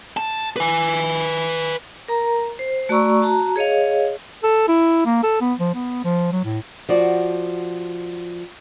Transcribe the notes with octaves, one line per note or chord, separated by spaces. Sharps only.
A5
B4 G#5
A#4 A#5
C5
A3 F#4 D5 A#5 C#6 E6
F#4 A5 A#5
G#4 C#5 D#5 F5
A4
E4
A#3
A4
B3
F3
B3
F3
F#3
A2
F3 F#4 D5